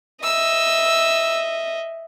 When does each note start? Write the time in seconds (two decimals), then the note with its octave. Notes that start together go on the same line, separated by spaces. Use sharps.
0.23 D#5 E5 E6